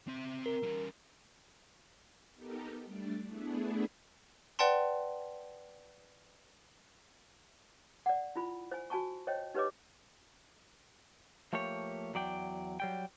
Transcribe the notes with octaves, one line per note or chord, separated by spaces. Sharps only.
C4 E5
A#4
G3 C#4
B3 D#4 G4 A4 A#4
G3 A3 D4 D5
A3 B3 D4 E4 G#4
B4 D5 F#5 G5 A5 C6
D5 F#5
E4 F4 B5
C5 G#5
F#4 G#5 A5 C#6
C5 C#5 D#5 G5
D#4 G4 B4 C#5 D#5 D6
F3 A3 A#3 G4 C#5
E2 F#3 D5 G5
F#3 G3 G5